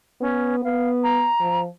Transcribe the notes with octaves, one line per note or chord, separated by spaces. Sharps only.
B3 C#4
B3 F5
A#5
F3